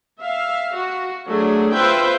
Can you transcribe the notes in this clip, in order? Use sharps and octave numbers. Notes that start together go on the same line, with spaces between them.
E5 F5
F#4
F#3 A3 D4 G#4
F4 B4 C5 E5 G5